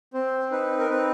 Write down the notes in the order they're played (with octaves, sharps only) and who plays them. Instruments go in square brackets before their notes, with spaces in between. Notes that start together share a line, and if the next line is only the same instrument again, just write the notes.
[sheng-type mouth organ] C4 C5
D#4 B4
A#4
C4 B4